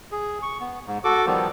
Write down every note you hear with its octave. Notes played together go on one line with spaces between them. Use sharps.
G#4
C#6
B3
G#2
F#4 A4 D6
D#3 F3 G3 B3